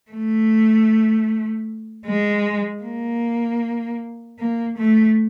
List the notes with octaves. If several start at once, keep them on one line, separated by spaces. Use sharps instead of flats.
A3
G#3
A#3
A#3
A3